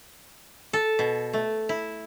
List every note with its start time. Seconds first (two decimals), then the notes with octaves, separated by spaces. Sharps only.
0.73 A4
0.99 B2
1.33 A3
1.69 E4